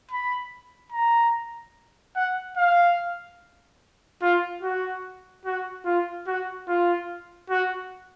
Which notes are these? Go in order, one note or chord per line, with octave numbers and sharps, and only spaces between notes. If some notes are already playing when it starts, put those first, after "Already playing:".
B5
A#5
F#5
F5
F4
F#4
F#4
F4
F#4
F4
F#4